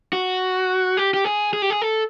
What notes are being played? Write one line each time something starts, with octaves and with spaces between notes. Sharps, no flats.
F#4
G4
G4
G#4
G#4
G4
G#4
A4